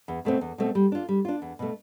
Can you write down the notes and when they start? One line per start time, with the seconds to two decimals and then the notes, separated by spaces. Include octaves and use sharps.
0.08 E2
0.25 B2 A3 C4
0.41 E2
0.58 B2 A3 C4
0.75 G3
0.92 D4 F4
1.09 G3
1.25 D4 F4
1.42 E2
1.59 B2 A3